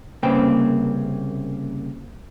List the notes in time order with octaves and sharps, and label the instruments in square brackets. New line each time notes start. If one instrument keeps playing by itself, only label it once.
[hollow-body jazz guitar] C2 C#3 A#3 C4 B4 G5